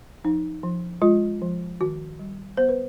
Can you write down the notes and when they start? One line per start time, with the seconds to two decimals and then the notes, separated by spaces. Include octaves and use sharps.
0.24 F3 D#4
0.63 F3
1.02 G#3 F4
1.42 F3
1.80 D#3 F#4
2.19 G3
2.57 B3 C5
2.69 B4